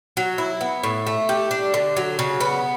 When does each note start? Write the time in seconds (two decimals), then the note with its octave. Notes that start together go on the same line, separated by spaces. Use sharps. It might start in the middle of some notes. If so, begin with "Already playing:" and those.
0.17 F#3
0.38 E4
0.61 B3
0.84 A2
1.07 A3
1.29 G4
1.51 D4
1.74 D3
1.97 F#3
2.19 C#3
2.41 B3